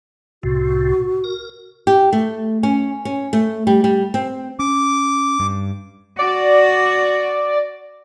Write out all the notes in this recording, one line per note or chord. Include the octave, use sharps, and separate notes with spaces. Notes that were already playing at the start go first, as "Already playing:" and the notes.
C2 A2 C3 F#4
A#4
G4
A3
C#4
C#4
A3
G3
G3
C4
C#4 D6
G2
F#4 D5